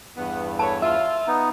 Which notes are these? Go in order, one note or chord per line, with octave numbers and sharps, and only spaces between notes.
E2 G2 B3
A4 B4 C#5 A5
F4 E5
B3 D#4